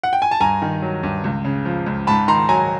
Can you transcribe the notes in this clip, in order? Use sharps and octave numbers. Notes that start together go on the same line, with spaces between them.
F#5
G5
G#5
A5
G2 G#5 A#5
D#3
F#3
G2
C#2
C#3
F3
C#2
G#2 A5 B5
D#3 A#5 C6
F#3 G#5 A#5